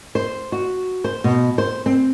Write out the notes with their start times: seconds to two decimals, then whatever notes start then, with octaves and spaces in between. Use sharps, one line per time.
0.15 C5
0.52 F#4
1.04 C5
1.24 B2
1.58 C5
1.86 C4